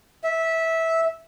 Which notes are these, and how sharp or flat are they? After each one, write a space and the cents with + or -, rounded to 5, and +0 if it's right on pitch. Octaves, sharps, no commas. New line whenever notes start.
E5 -15